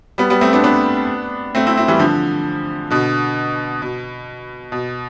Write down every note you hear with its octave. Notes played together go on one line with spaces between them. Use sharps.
G3 B3
G3 B3
A3 C4
B3 D4
B3 D4
A3 C4
C4 E4
C4 E4
E3 G3
D3 F3
B2 D3
B2
B2